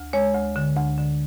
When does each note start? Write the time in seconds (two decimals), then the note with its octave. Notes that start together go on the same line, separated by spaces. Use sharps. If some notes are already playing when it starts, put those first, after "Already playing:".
Already playing: D2
0.13 G#3 C#5
0.34 D2
0.56 D3
0.77 D2
0.98 D3